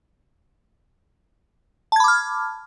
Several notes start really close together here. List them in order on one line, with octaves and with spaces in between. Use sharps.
A5 G#6 B5 D6 F6